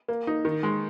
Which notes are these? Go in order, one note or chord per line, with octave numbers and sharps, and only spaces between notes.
A#3
D#4
D#3
G#3